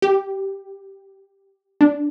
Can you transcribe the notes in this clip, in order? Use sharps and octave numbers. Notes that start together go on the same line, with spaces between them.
G4
D4